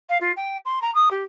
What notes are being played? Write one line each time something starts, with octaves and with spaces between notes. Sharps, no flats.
F5
F4
G5
C6
A#5
D#6
G4